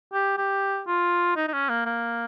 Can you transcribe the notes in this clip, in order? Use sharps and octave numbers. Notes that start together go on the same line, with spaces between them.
G4
G4
F4
D#4
D#4
C#4
A#3
A#3